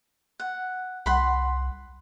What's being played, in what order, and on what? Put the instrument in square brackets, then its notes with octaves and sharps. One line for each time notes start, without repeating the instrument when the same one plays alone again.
[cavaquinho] F#5
[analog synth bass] C2 [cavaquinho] F#5 B5 C6